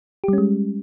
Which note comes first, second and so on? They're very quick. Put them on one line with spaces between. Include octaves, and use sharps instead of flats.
G4 G3 C#4 G#3